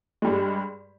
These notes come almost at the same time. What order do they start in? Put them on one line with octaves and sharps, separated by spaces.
G#3 G3 G2